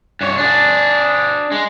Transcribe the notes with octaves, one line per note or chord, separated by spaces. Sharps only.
G2 C#5
D4 G#4
G#3